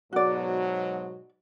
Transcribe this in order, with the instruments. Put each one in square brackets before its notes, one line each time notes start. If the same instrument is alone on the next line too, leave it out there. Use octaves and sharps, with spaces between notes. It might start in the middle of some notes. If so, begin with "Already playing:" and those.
[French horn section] G#2 B2 F#3 [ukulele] F#4 D5